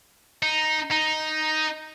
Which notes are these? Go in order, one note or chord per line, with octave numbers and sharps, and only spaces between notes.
D#4
D#4